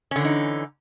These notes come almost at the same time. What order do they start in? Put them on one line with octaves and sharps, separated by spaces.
C#4 D3 E3 D#4